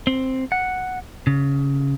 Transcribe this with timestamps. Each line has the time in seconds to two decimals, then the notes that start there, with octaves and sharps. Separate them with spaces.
0.07 C4
0.52 F#5
1.27 C#3